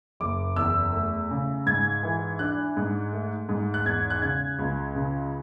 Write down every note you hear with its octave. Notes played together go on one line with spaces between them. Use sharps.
F#1 D6
E2 E6
A3
C#3
G#2 G#6
E3
D4 F#6
G#2
A3
G#2
F#6
E2 G#6
F#6
C#3 G#6
C#2
C#3